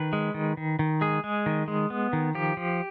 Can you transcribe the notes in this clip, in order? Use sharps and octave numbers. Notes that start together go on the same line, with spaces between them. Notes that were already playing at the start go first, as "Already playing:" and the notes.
Already playing: D#3 B4
G#3
D#3
D#3
D#3
G#3 G#4
G#3
D#3
G#3
B3
D#3
F3 G4
F3